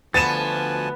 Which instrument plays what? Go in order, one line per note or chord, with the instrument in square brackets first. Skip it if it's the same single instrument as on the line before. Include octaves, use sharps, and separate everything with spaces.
[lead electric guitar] D2 [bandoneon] F3 G#5 A5 [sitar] B3 [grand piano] A6 D#7 E7